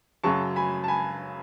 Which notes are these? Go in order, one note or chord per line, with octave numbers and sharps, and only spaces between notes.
F#2 C#3 F#3 A5 C#6
G#5 B5
A5
G#5 B5